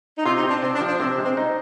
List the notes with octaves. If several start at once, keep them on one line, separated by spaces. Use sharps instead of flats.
D#4
C3 F4
D#4
C4
D4
C3 C4
D4
F3
D4
C3 C4
G#3
C4
D#4